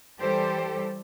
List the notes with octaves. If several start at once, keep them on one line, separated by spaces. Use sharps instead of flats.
E3 G3 G4 A4 C5